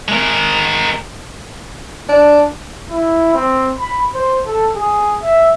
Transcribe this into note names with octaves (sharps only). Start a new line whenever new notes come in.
G#3 A#4
D4
E4
C4
B5
C5
A4
G#4
E5